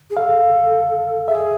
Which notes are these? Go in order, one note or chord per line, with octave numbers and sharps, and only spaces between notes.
G#4
A4 F5
G#4 E5